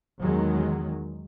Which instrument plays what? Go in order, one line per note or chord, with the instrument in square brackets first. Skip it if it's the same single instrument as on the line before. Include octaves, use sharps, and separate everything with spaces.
[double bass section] E2 D#3 F#3 G#3